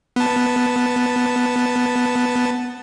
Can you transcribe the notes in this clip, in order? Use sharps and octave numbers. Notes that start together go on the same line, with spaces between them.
B3 A5